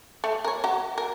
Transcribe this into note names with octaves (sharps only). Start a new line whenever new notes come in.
A3
A#4 C#5
F#4 A#5
A#4